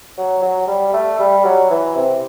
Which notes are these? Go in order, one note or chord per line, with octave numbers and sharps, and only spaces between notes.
F#3
F#3
G3
A3
G3
F#3
E3
C3